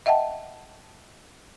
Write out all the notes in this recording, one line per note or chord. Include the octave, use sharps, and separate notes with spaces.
D#5 E5 F#5 G5 A5